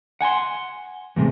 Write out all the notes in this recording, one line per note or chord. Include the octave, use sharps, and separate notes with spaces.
F#5 G#5 A5 C6
E2 A2 C3 G#3